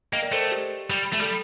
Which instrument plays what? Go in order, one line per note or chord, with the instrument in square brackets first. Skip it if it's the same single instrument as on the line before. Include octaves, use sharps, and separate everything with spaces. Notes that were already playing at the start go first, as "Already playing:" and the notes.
[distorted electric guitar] A#3 [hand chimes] D#5 G5
[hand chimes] A#4 D5
[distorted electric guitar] A3 [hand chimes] A4 C5
[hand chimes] G4
[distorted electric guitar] G3
A3
[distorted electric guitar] G3 [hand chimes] A4